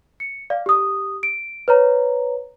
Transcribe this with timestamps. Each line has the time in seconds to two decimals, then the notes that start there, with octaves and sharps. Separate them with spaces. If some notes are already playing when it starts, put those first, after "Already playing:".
0.20 C#7
0.50 D5 F5
0.66 G4 D#6
1.23 D7
1.68 B4 C#5 A#5